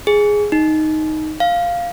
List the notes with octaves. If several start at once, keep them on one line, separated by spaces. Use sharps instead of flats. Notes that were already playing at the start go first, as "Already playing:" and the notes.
G#4
D#4
F5